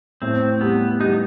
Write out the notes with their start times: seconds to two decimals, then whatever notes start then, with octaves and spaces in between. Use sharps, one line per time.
0.22 A2 C4
0.61 G3 B3
1.00 G3 D#4